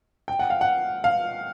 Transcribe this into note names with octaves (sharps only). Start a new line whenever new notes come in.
G5
F#5
F5
F#5
F5